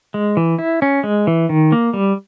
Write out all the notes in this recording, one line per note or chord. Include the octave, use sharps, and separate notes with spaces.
G#3
E3
E4
C#4
G#3
E3
D#3
A#3
G3